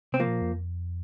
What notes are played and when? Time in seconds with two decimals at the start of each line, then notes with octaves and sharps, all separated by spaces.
0.12 C3 C4
0.20 F3 A#3
0.27 A#2
0.42 F2